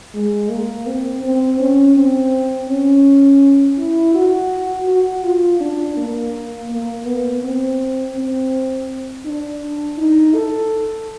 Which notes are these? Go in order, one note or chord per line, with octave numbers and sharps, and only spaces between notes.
G#3
A#3
C4
C4
C#4
C4
C#4
E4
F#4
F#4
F4
D4
A#3
A#3
B3
C4
C4
D4
D#4
A4